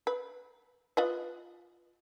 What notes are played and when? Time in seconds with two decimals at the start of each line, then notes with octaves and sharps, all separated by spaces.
0.07 B4
0.97 F4 B4 D#5